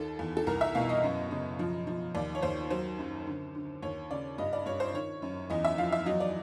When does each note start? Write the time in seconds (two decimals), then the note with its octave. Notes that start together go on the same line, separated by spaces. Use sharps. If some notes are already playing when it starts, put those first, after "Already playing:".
Already playing: D#2 D#3 A4
0.19 E2
0.37 A4
0.47 C2 A#4
0.61 E5
0.75 B2 F5
0.89 D#5
1.03 F#2
1.31 C#3
1.59 F3
1.87 F3
2.15 D#2 D5
2.35 C#5
2.42 D#2 C5
2.70 F#3 C5
2.99 F#2
3.27 D3
3.55 D3
3.82 D#2 C#5
4.10 C#3 D5
4.38 G2 D#5
4.53 D5
4.66 G2 C#5
4.80 C5
4.94 D#3 C#5
5.22 F#2
5.50 E2 D#5
5.64 E5
5.78 F3 F5
5.92 E5
6.06 F#3 D#5
6.20 D5